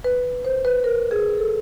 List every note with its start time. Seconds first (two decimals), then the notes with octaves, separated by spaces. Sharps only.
0.04 B4
0.45 C5
0.65 B4
0.84 A#4
1.11 G#4
1.38 A4